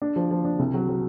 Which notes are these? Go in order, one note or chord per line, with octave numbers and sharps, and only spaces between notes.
D4
F3
F3
D4
C2
F#3
F#3